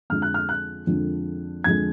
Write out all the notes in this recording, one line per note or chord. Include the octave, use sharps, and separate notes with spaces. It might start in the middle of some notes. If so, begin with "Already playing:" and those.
F2 D3 F3 G#3 F6
F#6
F6
F#6
F2 D3 F3 G#3
F2 D3 F3 G#3 G#6